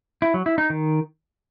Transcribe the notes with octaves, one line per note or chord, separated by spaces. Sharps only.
E4
F#3
E4
D#4
D#3